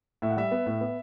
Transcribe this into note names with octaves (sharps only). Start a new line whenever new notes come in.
A2 E5
F#5
G3 E5
B3
A2
B3